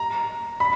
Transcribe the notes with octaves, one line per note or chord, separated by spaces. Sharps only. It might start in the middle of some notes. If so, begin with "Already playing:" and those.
Already playing: A#5
B5